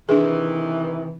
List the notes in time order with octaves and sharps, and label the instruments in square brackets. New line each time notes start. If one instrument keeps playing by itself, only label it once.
[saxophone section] C3 D#3 E3 [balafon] D4 G#4